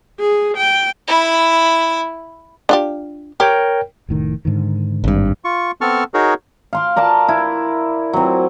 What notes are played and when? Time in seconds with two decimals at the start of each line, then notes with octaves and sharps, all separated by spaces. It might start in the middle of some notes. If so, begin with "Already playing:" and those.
0.20 G#4
0.58 G5
1.08 E4 B5
2.69 D4 F4 G4
3.40 G4 A#4 C#5 G5
4.09 F1 A2 D#3
4.45 G#2 D3 D#3
5.04 G#1 G2
5.45 F4 C#6
5.81 B3 C4 A4 A5 C#6 F6
6.14 D#4 F#4 G#4 A#4 C#5
6.73 F5 C6 D6
6.96 A#4 D5 F5 A5
7.28 E4
8.13 F#3 C4